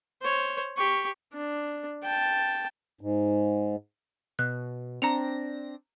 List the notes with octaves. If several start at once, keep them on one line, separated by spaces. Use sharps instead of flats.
C5 C#5
G4 C#6
D4
G5 A5
G#2
B2 F#6
C4 D4 A#5 A#6 C#7 F7